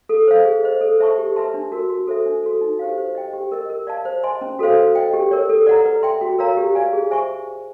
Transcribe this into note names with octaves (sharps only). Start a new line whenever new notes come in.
A4
C5 F5
G#4
C5 D#5
A4
C5 E5 A5 C#6
G4
B4 E5 A5 C6
D4
F#4 A#4
F#4
A4 C5 E5
D4
F#4 A4
D#4
G4 C5 F5
C5
D#5 G5
G4
A#4 D#5
A#4
D5 F5 A5
C5
D#5 G#5 C6
C#4
F#4 A4 C5 F5
B4
D#5 G5
G4
A#4 C#5
A4
D5 F#5 A#5
B4
E5 G5 C6
F#4
A#4 C#5 F5 A#5
G4
B4 D5 F5 G#5
G#4
C5 E5 G#5 C#6